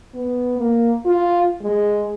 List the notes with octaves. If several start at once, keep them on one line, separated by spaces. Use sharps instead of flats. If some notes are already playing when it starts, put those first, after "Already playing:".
B3
A#3
F4
G#3